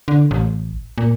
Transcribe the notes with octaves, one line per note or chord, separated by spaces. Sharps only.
D3
A1
A#2